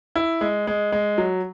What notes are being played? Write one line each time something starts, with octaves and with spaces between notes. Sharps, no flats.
E4
G#3
G#3
G#3
F#3